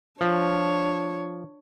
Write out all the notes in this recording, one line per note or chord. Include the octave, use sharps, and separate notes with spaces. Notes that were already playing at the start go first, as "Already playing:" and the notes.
F3 D4 C#5